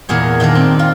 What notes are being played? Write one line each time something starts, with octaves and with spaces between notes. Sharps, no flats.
E2 A#2 G#4 C#5
A#2 D#3 D4 A#4
C4
F4